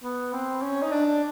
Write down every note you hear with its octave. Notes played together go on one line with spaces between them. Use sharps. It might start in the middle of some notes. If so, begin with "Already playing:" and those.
B3
C4
C#4
D#4
D4